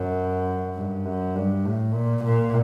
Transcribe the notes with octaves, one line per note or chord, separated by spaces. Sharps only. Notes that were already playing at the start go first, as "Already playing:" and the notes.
Already playing: F#2
G2
F#2
G2
A2
A#2
A#2